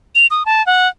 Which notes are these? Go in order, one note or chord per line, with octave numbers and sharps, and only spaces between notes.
F7
D#6
A5
F#5